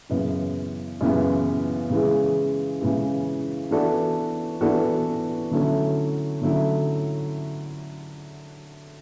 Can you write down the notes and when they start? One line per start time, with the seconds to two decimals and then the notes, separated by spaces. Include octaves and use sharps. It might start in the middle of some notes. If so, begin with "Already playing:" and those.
0.09 F#2 C#3 E3 B3
1.01 F#2 C#3 E3 B3
1.90 C#3 E3 G#3
2.81 C#3 E3 G#3
3.71 E3 B3 D4 F#4 A4
4.61 E3 B3 D4 F#4 A4
5.51 D3 F#3 A3 C#4 E4
6.42 D3 F#3 A3 C#4 E4